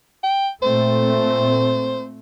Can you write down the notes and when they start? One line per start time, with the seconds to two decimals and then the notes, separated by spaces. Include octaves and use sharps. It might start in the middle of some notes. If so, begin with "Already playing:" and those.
0.24 G5
0.62 A#2 A3 C4 C5